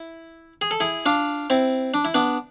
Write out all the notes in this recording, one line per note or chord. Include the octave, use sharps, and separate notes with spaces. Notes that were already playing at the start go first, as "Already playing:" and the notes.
Already playing: E4
G#4
A4
E4 G#4
D4 F4
C4 E4
D4
E4
B3 D4